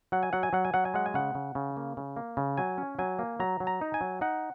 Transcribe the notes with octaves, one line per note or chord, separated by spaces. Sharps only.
F#3 F#5
G#5
F#3 F#5
G#5
F#3 F#5
G#5
F#3 F#5
G#5
G#3 F#5
G#5
C#3 F#5
C#3
C#3
A#3
C#3
A#3
C#3
F#3 G#5
C#4
F#3 G#5
A#3
F#3 A#5
F#3
A#5
D#4
G#5
F#3
D#4 F#5